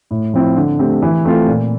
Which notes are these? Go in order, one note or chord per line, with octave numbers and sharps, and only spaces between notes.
A2
F3 C4 E4
D3
A3 C4 G4
E3
A3 C4 F4
A#2